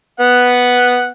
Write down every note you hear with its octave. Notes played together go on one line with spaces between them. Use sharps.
B3 F#5